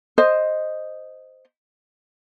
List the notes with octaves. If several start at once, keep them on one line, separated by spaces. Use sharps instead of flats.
C5 D#5